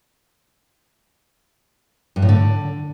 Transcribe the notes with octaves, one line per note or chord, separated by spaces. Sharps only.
G2
A2
D3